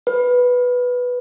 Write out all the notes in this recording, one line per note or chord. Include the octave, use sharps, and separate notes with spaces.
B4